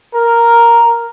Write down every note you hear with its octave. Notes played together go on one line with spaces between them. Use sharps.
A#4